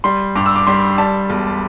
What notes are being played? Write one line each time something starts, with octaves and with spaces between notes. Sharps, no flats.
G3 C6
G2 D6
E6
D6
G3 C6
G3 A5
E1